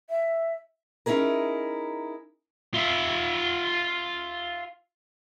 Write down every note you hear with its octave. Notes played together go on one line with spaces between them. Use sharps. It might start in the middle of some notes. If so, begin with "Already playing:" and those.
E5
C#4 D#4 E4 G#4 A#4
F4 E5